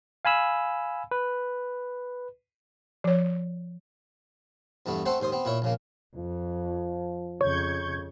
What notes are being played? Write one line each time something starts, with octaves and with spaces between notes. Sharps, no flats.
F5 G#5 B5 E6
B4
F3 C#5
E2 G2 A3 B3
A3 C4 A4 C5 F#5
D#2 G#2 C5 D#6
B3 C4
A#2 E4 C#5
A#1 C#3 A#3
F2 F3
F2 C#3 C#5 C#6 G6 G#6